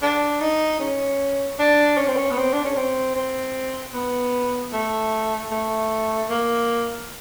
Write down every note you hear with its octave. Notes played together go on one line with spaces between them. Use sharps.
D4
D#4
C#4
D4
C#4
C4
C#4
B3
C4
D4
C#4
C4
C4
B3
A3
A3
A#3